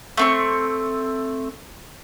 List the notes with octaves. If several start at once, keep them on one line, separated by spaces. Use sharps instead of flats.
A3 C4 C#6